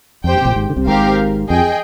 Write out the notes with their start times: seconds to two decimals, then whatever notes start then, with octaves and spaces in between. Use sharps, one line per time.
0.24 F2 G4 C5 G5
0.35 G2
0.41 C3
0.45 A#1 A#2
0.56 G#1 G#2
0.70 D3
0.76 C2 C3
0.87 G#1 G#2 C4 G4 A#4 F5
1.49 F2 G#4 D#5 G5